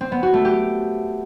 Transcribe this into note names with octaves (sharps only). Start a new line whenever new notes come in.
C4
B3
F#4
A3
G4